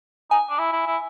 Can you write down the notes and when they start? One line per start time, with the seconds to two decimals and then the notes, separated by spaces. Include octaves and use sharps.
0.31 D#4 G#5
0.49 D4
0.59 E4
0.73 E4
0.87 E4